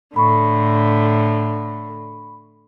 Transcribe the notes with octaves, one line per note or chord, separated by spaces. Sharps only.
A2 D3 B5 C#6